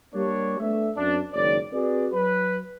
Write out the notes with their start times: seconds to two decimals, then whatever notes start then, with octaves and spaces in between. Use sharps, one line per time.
0.15 G3 A#3 D4 C#5
0.59 A3 B3 D4 A4 E5
0.97 F#2 C4 D4
1.33 F#1 D#3 G#3 C#5 D5
1.73 C4 F#4 G#4 B4 D5
2.13 F#3 B4